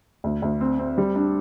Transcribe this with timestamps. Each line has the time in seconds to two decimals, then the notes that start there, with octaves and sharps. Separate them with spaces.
0.24 D2
0.42 D2
0.61 C4
0.79 C4
0.98 G3
1.16 D4